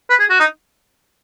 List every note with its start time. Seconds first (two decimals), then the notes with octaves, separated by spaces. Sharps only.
0.09 B4
0.19 G#4
0.29 F#4
0.39 D#4